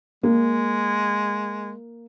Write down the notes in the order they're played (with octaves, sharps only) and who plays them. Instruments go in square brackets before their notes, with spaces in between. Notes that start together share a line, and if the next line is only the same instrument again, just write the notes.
[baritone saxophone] G#3 [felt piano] A#3